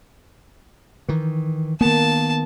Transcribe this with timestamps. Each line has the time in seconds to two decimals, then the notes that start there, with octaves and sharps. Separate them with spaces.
1.08 D#3 E3
1.81 D#3 A#3 B3 A5